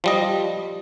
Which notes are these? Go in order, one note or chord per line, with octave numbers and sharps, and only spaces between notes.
F3 G3 D#5